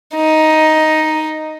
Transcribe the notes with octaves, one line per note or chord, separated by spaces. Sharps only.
D#4